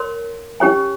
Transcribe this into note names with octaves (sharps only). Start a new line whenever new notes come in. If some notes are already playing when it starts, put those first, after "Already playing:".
Already playing: A#4 C#5 C6
C#4 G4 C#5 G#5